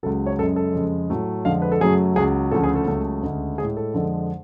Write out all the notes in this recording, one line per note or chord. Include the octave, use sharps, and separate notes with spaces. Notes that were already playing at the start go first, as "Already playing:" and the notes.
C#2 C#3 F#3 A4
C#5
F#2 C#3 G#3 A4
A4
F2 C#3 G#3
A2 F#3 A3
F2 D3 G#3 F5
B4
A4
F#2 C#3 F#3 A3 G#4
C#2 C#3 F#3 G#4
D2 C#3 F3 A3 A4
G#4
A4
C#2 C#3 F#3 A3
D2 C#3 G#3
A2 G#3 G#4
A4
F2 D3 G#3